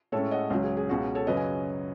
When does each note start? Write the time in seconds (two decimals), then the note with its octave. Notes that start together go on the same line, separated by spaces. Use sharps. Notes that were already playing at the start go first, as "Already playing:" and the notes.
0.12 A2 G#3 C#4 A4 C#5
0.31 D#5 F#5
0.50 C#2 C#3 F#3
0.64 G#4
0.77 G#4
0.89 C#2 B2 G#3 C#4 F#4
1.15 A4 C#5
1.27 F#2 C#3 F#3 B4 D#5
1.37 G#5